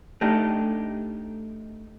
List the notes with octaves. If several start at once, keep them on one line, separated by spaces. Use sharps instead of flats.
A3 D4 D#4 G4